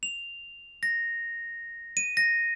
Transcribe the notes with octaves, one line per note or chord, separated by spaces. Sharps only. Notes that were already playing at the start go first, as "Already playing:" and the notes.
F7
A#6
D#7
A#6